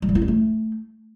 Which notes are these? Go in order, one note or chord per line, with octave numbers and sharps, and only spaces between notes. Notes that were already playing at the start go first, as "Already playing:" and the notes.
G#3
G3
E4
C4
A3